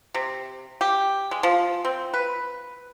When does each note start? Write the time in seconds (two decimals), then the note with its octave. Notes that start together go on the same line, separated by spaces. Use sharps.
0.14 C3
0.81 G4
1.31 G#3
1.43 F3
1.85 C4
2.14 B4